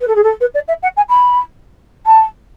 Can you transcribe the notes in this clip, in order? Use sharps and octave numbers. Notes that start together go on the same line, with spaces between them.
B4
A4
G#4
A4
B4
D5
E5
F#5
G#5
B5
A5